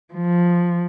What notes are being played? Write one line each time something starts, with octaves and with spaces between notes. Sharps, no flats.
F3